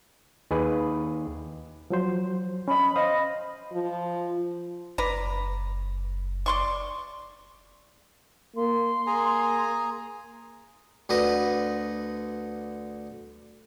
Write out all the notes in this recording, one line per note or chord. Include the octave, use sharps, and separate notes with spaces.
D#2 G#4 B4
F3 F#3 C5
C#4 D#5 B5
C5 D#5 F5 D#6
F3
F#1 B4 D5 A#5
D5 C6 C#6
A#3 C6
A#3 G#4 G#5 A#5
D2 D3 B4 D#5